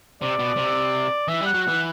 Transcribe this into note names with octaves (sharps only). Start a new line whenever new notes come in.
C3 D5
B2
C3
E3 E5
G3
F#5
F#3
E3 F#5